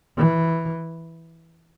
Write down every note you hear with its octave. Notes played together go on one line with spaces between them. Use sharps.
E3